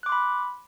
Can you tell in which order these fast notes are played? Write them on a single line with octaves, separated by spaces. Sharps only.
F#6 D6 C6 B5